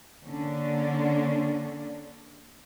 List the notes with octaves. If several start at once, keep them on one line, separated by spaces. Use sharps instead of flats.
D3 A#3 C#4 D4